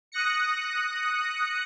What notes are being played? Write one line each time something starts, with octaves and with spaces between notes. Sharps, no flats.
D#6 F#6 A#6 C#7